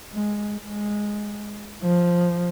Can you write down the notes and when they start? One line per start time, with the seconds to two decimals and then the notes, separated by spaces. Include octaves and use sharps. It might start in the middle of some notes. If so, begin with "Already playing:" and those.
0.13 G#3
0.55 G#3
1.83 F3